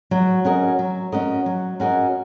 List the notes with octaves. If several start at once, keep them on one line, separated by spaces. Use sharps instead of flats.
F#3
C#4 F#4 A#4 D#5
F#3
C#4 F#4 A#4 D#5
F#3
C#4 F#4 A#4 D#5